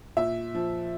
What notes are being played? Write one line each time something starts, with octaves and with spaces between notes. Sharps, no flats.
A#2 E5
F3